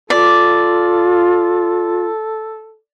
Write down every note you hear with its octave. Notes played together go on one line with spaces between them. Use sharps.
F4 A4 D5